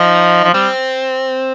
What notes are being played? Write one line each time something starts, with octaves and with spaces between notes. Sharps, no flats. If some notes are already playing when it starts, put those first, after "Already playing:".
Already playing: F3 D#4
F3
G3 C4